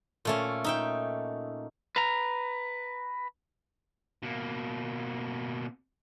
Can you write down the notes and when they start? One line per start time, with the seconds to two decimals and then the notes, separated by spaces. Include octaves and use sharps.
0.25 A#2 A3 C#4
0.64 D#4 E5 G5
1.96 B4 A#5
4.23 B2 A#3